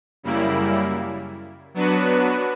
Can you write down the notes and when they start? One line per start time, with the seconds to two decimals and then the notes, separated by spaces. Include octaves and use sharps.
0.23 F#2 C#3 G3 A#3 E4
1.74 F#3 B3 D4 F#4 B4